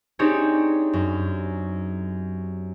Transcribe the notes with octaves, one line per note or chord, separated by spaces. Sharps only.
C4 D4 D#4 G4 G#4 C#5
F#2